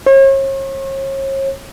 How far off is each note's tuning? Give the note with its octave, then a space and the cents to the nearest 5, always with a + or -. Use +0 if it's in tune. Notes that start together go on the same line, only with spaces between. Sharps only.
C#5 -40